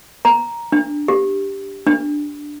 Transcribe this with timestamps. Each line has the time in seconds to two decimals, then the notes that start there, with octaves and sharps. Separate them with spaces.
0.25 A#5
0.72 D4
1.08 G4
1.87 D4